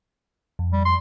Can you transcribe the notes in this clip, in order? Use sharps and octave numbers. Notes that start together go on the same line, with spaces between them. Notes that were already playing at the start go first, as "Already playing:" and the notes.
F2
G3
C6